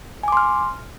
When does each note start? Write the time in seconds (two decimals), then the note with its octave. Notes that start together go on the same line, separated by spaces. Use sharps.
0.23 G#5
0.28 D6
0.32 C6
0.37 F6